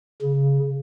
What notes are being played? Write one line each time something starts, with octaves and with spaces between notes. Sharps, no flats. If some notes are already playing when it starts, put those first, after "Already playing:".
C#3